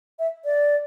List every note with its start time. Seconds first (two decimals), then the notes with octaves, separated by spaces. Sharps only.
0.19 E5
0.45 D5